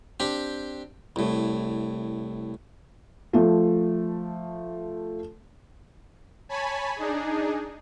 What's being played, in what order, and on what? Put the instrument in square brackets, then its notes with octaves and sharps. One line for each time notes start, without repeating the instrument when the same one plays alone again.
[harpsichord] C4 D4 G4
C2 A2
[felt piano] F3 A3
[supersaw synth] C#5 G#5 A5 B5
D4 D#4 G#4